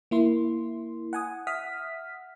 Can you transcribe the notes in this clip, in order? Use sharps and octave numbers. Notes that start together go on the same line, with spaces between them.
A#3 E4 C6
F#5 G#5 D#6
E5 F#5 D#6 F6 B6